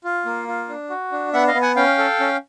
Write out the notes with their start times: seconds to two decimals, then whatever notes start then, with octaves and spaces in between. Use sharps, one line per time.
0.04 F4
0.25 A#3
0.48 F4
0.69 D4
0.90 F#4
1.12 D4
1.33 B3 E5 F#5
1.48 D#5 F5
1.54 B3
1.62 F#5 G#5
1.76 C#4 F5 G5
1.98 A4
2.20 C#4